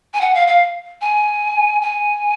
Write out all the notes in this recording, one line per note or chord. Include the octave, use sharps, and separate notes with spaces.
G#5
F#5
F5
F5
G#5
G#5